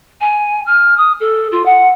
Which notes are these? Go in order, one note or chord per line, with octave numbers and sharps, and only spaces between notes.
G#5
F6
D#6
A4
F4
F#5